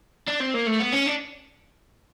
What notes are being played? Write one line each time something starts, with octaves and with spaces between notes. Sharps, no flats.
D4
C4
A#3
A3
B3
C#4
D4